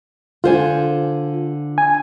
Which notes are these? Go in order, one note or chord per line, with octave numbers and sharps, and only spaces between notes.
D3 F4 C5 G#5
G#5